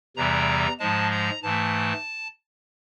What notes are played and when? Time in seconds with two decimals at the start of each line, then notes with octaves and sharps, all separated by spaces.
0.17 E2 C3 E3 G3 A#5
0.80 G#2 F3 G#3 A5
1.11 A#5
1.43 G#2 E3 A3 A5